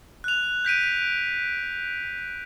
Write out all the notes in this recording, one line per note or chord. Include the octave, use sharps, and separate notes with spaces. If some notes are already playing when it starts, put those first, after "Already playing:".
F#6 F7
G6 B6 D7 D#7